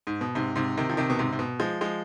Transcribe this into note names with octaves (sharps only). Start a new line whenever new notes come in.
G#2
B2
G#2 C3
G#2 C3
C3 D#3
F3
C3 D#3
B2
G#2 C3
C3
B2
F3 G#3
F3 G#3